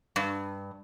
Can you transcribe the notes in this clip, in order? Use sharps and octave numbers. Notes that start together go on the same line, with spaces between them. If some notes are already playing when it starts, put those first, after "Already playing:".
G2